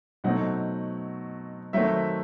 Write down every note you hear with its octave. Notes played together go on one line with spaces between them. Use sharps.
B2 F#3 A3 C4 D#4 F#5
D#3 F#3 A3 C4 E5